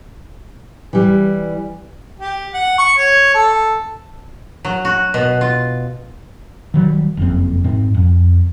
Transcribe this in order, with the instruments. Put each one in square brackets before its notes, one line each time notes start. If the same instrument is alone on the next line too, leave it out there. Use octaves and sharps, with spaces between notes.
[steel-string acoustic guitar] E3 G3
[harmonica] G4
F#5
C#6
C#5
A4
[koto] F#3
F#4
B2
F4
[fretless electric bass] D#3 F#3 G3
F#1 F2 C4
G#2 C4
F2